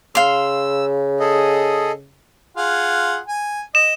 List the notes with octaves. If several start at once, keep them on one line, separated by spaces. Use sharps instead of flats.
C#3 F5 C6 E6
G#4 A4 D#5
F4 G#4 F#5
G#5
D#5 E7